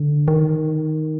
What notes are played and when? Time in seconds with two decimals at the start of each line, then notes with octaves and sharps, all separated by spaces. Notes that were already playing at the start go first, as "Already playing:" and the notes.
Already playing: D3
0.28 D#3